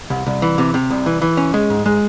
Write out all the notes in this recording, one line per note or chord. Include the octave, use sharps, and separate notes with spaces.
C2
C2
E3
C3
C3
C2
E3
E3
C#4
G#3
G#2
G#3